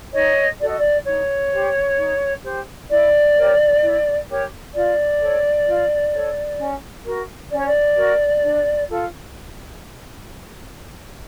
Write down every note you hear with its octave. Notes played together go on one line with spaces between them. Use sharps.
D#4 C#5 D#5
F#4 A4 D5
D#5
D5
D#4 C#5
G4 C5
D#4
G4 C5
E4 D5
G4 A#4 C#5
E4
G4 A#4 C#5
F4 D5
A4 C#5
F4
A4 C#5
C#4
F#4 A#4
C#4 D5
C#5
D5
F#4 A#4
D4
F4 A4